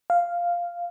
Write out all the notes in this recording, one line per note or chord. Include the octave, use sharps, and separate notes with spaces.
F5